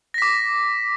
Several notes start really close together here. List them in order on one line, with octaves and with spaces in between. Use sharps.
A#6 B6 D6